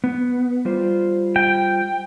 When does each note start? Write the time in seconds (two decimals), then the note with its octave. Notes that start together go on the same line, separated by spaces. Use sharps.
0.04 B3
0.65 G3 F4 C5
1.36 G5